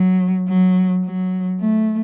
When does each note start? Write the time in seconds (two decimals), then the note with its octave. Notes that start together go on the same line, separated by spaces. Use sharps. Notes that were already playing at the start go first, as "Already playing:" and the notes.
Already playing: F#3
0.48 F#3
1.04 F#3
1.60 A3